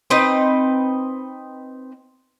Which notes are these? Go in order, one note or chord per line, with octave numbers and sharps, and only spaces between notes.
C4 D#4 B4 D#5